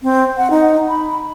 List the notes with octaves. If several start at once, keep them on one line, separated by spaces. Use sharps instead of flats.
C4
F#5
D#4
B5